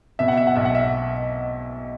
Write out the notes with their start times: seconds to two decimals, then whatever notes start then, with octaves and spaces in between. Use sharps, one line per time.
0.19 B2 E5
0.28 F#5
0.37 E5
0.47 F#5
0.56 B1 E5
0.65 F#5
0.75 E5